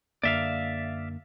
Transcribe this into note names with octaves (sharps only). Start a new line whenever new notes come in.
F#2 D3 A#3 D5 E5 F5